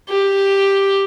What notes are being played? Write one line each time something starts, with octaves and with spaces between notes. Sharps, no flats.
G4